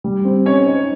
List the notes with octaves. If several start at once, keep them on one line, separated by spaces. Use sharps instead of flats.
G3
C4
C#4 D#4 C#5
D#4